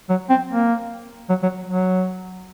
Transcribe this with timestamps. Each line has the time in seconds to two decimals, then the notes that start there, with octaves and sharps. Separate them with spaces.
0.09 F#3
0.30 C4
0.50 A#3
1.29 F#3
1.43 F#3
1.69 F#3